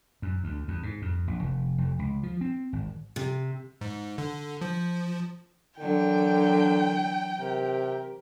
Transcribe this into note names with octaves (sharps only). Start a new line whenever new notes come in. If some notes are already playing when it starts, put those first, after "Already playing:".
F#2
D2
E2
G#2
F2
A#1
F1
F1
C#2
F3
C4
G#1
C3
G#2
D3
F3
D3 E3 F#3 D4 A#4 G5
C3 G4 A#4